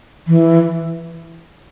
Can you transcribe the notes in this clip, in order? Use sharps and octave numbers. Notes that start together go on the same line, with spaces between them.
E3